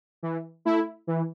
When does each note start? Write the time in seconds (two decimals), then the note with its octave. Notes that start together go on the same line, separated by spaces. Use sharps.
0.23 E3
0.65 A3 E4
1.07 E3